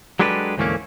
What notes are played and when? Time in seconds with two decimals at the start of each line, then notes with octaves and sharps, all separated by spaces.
0.19 F#3 G#3 D4 G4 A4 B4
0.58 D2 G#2 E3 A3 A#3 C#4